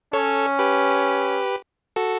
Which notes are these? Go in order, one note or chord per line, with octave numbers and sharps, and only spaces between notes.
C#4 A4 C#5
G4 B4
F#4 A4